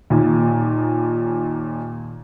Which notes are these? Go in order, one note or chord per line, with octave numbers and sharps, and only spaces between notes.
D#2 A#2